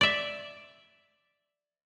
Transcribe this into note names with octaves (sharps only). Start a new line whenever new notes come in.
D5 E5